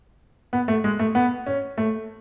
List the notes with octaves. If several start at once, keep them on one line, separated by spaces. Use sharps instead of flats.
B3
A3
G#3
A3
B3
C#4
A3